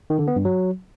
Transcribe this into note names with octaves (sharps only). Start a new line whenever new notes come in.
D#3
D3
B3
G2
F#3